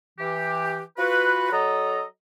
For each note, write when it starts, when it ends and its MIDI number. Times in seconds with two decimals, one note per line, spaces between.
0.19 0.81 52
0.19 0.81 67
0.98 1.49 65
0.98 1.49 66
0.98 1.49 71
1.52 2.03 54
1.52 2.03 69
1.52 2.03 75
1.52 2.03 82